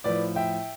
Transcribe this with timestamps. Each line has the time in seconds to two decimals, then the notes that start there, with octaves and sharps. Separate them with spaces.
0.04 A2 F3 B4 D5
0.36 E5 G5